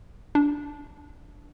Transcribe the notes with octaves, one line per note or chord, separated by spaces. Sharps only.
D4